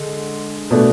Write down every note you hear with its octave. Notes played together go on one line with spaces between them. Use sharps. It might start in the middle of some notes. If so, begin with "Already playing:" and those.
Already playing: D3 G#3 A4
B2 A3 D4 A4